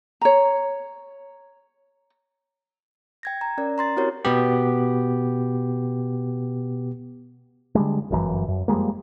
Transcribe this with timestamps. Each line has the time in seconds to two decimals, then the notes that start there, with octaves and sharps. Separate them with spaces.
0.21 C#5 A#5
3.23 G5 G#6 A#6
3.41 A#5
3.58 C#4 A#4 D5
3.78 A#5 C6 A6
3.97 C4 E4 F#4 G4 A#4 C#5
4.25 B2 B3 G4
7.75 D3 G3 G#3
8.10 G1 F#2 C#3 E3
8.48 F#2
8.68 F3 G3 G#3 A#3